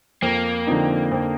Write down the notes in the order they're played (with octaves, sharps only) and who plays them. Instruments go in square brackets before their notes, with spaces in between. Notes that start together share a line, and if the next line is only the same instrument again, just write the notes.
[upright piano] F2 [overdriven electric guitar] A#3
[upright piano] D3 F3 C4 D#4
F2